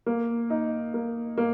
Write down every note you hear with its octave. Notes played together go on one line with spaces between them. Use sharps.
A#3
D#4
A#3
A#3